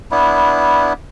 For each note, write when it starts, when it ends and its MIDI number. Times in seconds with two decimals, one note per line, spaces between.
0.11 0.93 59
0.11 0.93 62
0.11 0.93 64